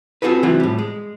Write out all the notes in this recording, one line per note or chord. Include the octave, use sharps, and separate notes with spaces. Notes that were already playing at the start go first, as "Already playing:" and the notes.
C4 F4 F#4 G#4 A4 B4
C3 E3 F#3 F4 F#4
A2 G3
G#3